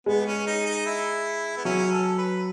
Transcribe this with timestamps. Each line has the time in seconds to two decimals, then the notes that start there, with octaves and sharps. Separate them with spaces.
0.06 G#3 B3
0.26 C#4
0.46 D#4
0.66 D#4
0.86 E4
1.57 B3
1.65 F#3 C#4
1.92 A4
2.18 B4